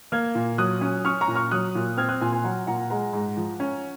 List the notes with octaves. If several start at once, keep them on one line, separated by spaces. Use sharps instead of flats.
A#3 F6 G#6
A#2
F#3 D#6 F#6
C#4
C#4 C#6 F6
A#5 C#6
A#2
C#6 F6
F#3 D#6 F#6
A#2
C4 F6 G#6
D#6 F#6
A#2 G#5 C6
G#5 C6
F#3 F#5 A#5
A#2 F#5 A#5
G#3 F#5 A#5
G#2
F3
C#4